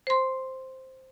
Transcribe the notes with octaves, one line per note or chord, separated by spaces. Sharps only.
C5 C6